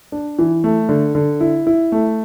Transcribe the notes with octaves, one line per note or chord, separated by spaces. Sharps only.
D4
E3
A3
D3
D3
E4
E4
A3